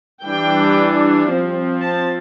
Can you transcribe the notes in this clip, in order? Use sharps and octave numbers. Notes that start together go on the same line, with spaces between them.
E3 G3 D4 G5
F3 C4
A5